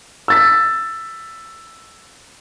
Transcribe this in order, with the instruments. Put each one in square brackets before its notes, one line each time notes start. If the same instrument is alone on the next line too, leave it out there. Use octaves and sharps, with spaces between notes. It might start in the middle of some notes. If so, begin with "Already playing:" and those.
[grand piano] E6 A6 B6